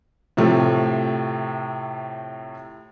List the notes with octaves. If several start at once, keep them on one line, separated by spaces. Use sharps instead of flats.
A2 C3 F3 A3